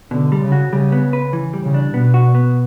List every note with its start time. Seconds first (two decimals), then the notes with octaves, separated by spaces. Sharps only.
0.11 B2 D3
0.32 G3
0.42 C#3
0.52 F#4
0.73 C#3 G3
0.92 B3
1.13 B4
1.33 E3
1.53 G3
1.63 C#3
1.74 D4
1.94 B2 B3
2.14 F#4
2.35 B3